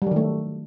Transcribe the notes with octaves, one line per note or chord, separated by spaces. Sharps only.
D#3 F#3 G3 A3